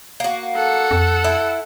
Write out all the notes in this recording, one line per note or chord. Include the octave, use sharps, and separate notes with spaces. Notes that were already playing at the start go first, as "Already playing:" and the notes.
A#3 F#4
A4 F#5
F2
E4